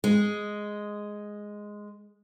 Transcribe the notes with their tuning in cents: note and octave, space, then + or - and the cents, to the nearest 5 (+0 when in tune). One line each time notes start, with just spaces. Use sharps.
G#3 +0 D#5 +0